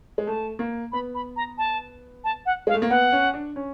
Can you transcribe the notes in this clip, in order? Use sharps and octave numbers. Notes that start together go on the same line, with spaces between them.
G#3
A3 A5
A#3
B3 B5
B5
A#5
A5
A5
F#5
G#3 F5
A3
A#3
B3 F#5
C#4
D4
C#4